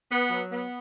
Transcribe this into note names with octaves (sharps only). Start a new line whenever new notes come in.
B3
F#3
B3